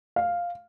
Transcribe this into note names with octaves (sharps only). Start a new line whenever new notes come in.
F5